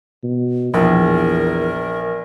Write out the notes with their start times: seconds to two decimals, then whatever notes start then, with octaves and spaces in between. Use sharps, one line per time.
0.24 B2
0.74 A#1 E2 A#4